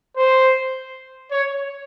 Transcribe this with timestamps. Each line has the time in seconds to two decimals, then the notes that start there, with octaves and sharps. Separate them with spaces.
0.17 C5
1.31 C#5